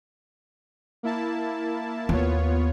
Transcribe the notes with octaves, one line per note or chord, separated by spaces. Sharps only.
A#3 E4 A5
D#2 B3 F4 C#5